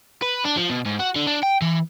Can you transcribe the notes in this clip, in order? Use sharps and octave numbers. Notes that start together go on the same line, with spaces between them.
B4
D4
F3
B2
G#2
F#4
D3
D4
G5
E3